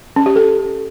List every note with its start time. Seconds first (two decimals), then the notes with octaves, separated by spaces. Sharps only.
0.16 C#4
0.26 G4
0.36 A4